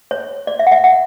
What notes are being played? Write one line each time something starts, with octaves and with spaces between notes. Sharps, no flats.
C#5
D5
E5
F#5
E5
F#5